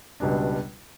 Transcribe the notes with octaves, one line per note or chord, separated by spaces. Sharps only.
C#2 B2 G3 D4